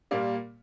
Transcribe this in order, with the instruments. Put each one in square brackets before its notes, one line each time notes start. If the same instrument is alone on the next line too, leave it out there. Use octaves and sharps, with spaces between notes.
[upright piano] A#2 G3 A#3